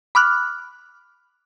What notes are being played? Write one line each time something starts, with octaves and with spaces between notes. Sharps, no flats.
B5 D6 F6 F#6